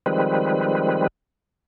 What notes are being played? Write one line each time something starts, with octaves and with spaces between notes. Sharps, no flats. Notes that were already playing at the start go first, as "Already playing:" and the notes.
D#3 F3 G3 G#3 C4 B4